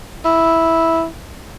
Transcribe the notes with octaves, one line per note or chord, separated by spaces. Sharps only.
E4